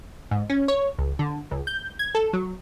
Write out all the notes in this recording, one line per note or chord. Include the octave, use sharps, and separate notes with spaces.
G#2
C#4
C#5
C#2
D3
C#2
G6
G#6
A4
F#3